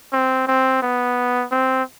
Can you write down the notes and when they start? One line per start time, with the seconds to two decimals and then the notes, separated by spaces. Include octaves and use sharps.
0.13 C4
0.47 C4
0.82 B3
1.51 C4